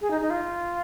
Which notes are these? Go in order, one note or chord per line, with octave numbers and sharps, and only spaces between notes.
G#4
D#4
D#4
F4